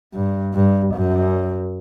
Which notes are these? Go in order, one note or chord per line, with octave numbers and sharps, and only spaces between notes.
G2
G2
F#2